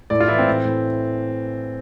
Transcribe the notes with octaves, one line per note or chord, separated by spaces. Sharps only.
A2 D5
F4
E3 E4
C4
A2
A2